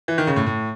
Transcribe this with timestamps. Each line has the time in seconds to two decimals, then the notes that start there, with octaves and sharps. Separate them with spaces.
0.08 E3
0.18 D#3
0.27 C#3
0.36 A2
0.47 A2